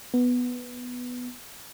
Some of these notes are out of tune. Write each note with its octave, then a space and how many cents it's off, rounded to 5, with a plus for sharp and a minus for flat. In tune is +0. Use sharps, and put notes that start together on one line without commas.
B3 +0